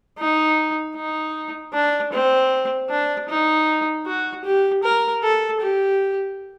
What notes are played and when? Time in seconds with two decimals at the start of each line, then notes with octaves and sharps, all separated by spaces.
0.18 D#4
0.96 D#4
1.73 D4
2.13 C4
2.90 D4
3.29 D#4
4.06 F#4
4.45 G4
4.83 A#4
5.23 A4
5.61 G4